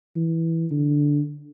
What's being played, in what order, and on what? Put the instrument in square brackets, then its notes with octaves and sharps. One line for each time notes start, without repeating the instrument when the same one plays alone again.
[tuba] E3
D3